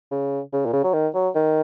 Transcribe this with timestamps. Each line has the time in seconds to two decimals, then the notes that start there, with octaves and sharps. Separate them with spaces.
0.11 C#3
0.53 C#3
0.66 A#2
0.73 C#3
0.84 F#3
0.93 D#3
1.14 F#3
1.35 D#3